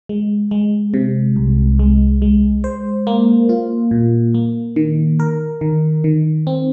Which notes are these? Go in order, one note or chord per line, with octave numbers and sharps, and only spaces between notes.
G#3
G#3
C3
C2
G#3
G#3
C5
A#3
F4
A#2
A#3
D#3
A#4
D#3
D#3
C4